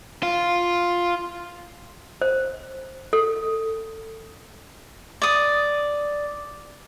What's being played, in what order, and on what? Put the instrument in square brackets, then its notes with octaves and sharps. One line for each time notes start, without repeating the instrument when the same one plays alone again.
[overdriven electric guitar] F4
[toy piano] C5
A4
[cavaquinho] D5 D#6